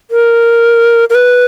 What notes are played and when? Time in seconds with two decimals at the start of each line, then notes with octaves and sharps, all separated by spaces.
0.11 A#4
1.10 A#4
1.15 B4